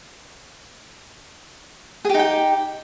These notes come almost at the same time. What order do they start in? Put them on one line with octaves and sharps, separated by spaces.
G#4 G4 D#4 G5